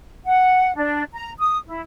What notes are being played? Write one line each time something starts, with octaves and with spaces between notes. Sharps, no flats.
F#5
D4
A#5
D#6
E4